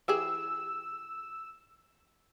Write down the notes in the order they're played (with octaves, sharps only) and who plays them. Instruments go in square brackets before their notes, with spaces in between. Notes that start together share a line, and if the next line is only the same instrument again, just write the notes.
[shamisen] E3 G4 G#4 [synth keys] E6